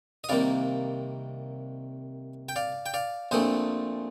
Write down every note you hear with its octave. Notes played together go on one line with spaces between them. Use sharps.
D#5
C2 C3 D#3 A#3 D5 F5
G5
D5 F5
G5
D5 F5
A#1 A#2 A3 C4 C5 D#5